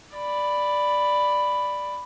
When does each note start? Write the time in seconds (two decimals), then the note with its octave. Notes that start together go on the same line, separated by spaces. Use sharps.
0.16 D5 B5